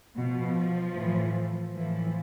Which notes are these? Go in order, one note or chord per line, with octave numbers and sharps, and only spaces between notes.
B2 F3
A2 E3
A2 E3 F3